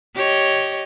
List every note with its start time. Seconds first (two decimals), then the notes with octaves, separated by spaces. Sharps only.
0.15 G4 C#5 D#5